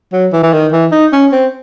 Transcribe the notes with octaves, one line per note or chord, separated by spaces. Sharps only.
F#3
E3
E3
D#3
E3
D#4
C#4
C4